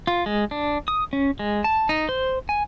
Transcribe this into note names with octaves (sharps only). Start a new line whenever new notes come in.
F4
G#3
D4
D#6
C#4
G#3
A5
D#4
C5
G#5